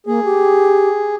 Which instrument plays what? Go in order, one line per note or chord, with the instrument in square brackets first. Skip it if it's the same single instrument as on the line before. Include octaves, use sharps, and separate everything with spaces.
[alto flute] A#3 [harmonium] G#4
[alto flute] G4